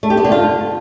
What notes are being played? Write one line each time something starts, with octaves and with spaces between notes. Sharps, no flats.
A3
G4
B3
D3
F4